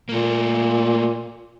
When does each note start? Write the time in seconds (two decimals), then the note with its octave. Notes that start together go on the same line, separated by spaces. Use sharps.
0.09 A#2 A3 A#3